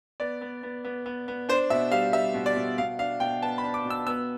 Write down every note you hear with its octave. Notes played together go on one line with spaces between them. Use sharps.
B3 D5
B3
B3
B3
B3
B3
D4 C5
B2 E5
G3 F5
G3 E5
B2
D5
B2
B2 F5
D4 F5
B2 G5
B3 A5
B5
D4
D6
B2
E6
B3 E6